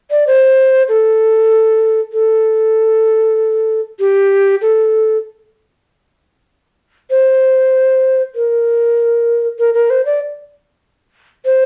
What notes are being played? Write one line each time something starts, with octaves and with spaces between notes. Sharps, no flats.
D5
C5
A4
A4
G4
A4
C5
A#4
A#4
A#4
C5
D5
C5